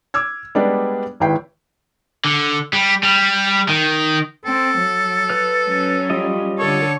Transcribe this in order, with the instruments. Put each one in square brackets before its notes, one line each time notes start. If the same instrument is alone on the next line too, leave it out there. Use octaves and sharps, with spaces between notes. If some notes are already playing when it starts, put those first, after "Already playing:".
[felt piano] D6 E6 F6 G#6
G3 G#3 B3 D4 D5
G#1 D#2 E4 B4 G5 C7
[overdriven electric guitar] D3
G3
G3
D#3
[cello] C4 [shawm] A4
[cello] F#3
[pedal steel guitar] B4 F6
[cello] F#3 C#4
[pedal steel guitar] G3 F4 D#5
[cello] D3 A4 [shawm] C#5